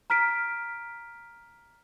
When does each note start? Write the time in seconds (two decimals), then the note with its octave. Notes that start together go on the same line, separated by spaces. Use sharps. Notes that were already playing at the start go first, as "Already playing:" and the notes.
0.10 A#5 F6 B6 D7